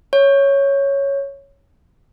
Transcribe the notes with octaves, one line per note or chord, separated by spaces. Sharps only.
C#5